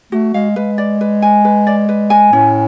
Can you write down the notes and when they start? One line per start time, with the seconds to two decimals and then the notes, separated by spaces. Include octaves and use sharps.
0.12 A3 F#4
0.34 G#3 F5
0.56 G#3 B4
0.78 D5
1.01 B4
1.22 G#5
1.45 B4
1.67 D5
1.89 B4
2.10 G#5
2.33 A2 C#4